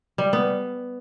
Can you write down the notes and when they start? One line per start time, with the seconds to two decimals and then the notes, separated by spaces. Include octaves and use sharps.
0.18 G3
0.33 B3